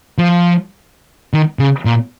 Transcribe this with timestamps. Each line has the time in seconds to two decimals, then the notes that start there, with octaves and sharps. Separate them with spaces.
0.18 F3
1.33 D#3
1.59 C#3
1.85 A#2